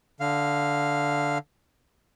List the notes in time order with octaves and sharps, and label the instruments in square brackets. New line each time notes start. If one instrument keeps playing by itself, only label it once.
[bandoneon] D3 F5